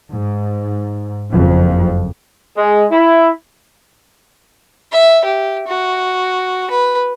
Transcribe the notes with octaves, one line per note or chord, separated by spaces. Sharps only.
G#2
F#1 F2 F3
G#3
E4
E5
G4
F#4
B4